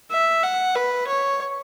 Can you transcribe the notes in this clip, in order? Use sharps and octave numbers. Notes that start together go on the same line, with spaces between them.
E5
F#5
B4
C#5